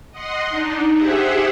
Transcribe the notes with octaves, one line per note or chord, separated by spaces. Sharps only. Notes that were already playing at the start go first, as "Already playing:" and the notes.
D#5 F#5 C6
D4 D#4
G4 G#4 C5 E5 F#5